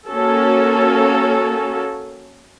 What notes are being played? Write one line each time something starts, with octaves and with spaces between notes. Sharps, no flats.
A#3 C#4 F#4 A4